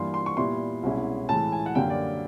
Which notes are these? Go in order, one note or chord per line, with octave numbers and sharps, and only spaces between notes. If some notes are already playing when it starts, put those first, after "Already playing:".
Already playing: G2 E3 G3 A#3 C6
C6
C#6
A#2 G3 B3 E4 C6
C2 B2 G#3 C#4 E4
A2 E3 G#3 A5
G#5
F#5
F#2 D3 G3 A#3 G5
D5